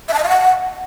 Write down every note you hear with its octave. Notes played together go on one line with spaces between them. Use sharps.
E5
A5
D#5
F5
F#5